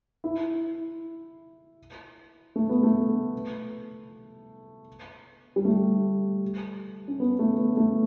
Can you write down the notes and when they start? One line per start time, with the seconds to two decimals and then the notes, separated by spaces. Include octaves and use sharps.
0.24 E4
2.56 A3
2.69 B3
2.83 A3
5.56 G3
5.65 A3
7.08 C#4
7.20 B3
7.39 A3
7.58 B3
7.77 A3